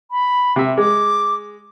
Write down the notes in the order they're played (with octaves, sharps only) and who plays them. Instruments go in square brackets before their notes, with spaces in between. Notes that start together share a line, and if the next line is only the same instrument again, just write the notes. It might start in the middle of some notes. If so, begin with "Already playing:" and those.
[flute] B5
[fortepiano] C3 E5
[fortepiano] G#3 [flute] D6